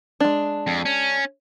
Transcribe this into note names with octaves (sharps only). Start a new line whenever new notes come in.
G#3 D4
F2
C#4